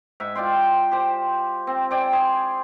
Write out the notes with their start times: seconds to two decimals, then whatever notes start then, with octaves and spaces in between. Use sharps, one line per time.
0.20 G#2 E5
0.35 F4 D5 G5 C6
0.91 G4 C5
1.67 C4
1.91 C5 D5 G5 G#5
2.13 G#4 C6